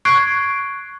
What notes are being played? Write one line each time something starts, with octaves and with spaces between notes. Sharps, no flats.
C#6 F#6 G#6 C7 D7